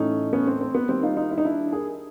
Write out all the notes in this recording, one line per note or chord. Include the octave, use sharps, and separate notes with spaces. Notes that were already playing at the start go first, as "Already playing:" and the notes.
Already playing: A2 E3 A3 C#4 D#4
B3 C#4
C4
C4
B3
D#3 G3 A#3 C4
D#4 F4
D#4 F4
E4
D#4
D4 E4
G#4 A#4